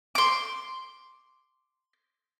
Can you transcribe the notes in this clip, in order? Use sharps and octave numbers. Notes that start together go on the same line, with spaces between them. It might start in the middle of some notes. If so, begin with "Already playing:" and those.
C6 D6